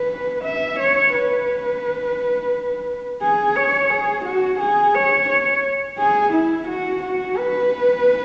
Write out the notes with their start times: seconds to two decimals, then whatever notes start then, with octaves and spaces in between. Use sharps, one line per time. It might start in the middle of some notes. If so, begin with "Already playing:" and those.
Already playing: B4
0.44 E5
0.79 C#5
1.14 B4
3.22 G#4
3.56 C#5
3.90 G#4
4.25 F#4
4.60 G#4
4.95 C#5
5.29 C#5
5.98 G#4
6.33 E4
6.68 F#4
7.02 F#4
7.37 B4